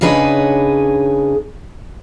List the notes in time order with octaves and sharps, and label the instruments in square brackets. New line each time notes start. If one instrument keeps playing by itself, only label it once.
[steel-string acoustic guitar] C#3 D4 D#4 G#4 B4 C#5